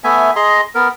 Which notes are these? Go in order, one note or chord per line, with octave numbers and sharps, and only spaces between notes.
A3 B3 E5 G#5
G#4 D#5 A#5 C6
B3 A#4